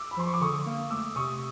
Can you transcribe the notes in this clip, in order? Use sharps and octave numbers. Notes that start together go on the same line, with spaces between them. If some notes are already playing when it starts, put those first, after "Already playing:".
Already playing: D6 E6
B5
F3 C6
C#6
D6
D3 C#6 D#6
A#3
A3 D6 E6
C3 C#6 D#6